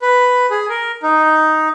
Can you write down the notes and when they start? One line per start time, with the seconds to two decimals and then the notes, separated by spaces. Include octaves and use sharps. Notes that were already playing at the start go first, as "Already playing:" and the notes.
0.02 B4
0.50 G#4
0.69 A#4
1.03 D#4